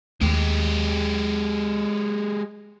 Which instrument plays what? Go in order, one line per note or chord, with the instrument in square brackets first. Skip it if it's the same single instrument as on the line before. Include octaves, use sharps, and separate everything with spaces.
[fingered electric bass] D#2 A3 [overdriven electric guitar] G#3 G4